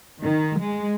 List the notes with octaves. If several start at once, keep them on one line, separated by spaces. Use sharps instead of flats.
D#3
G#3